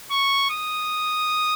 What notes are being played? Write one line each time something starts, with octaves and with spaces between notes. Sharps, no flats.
C#6
D#6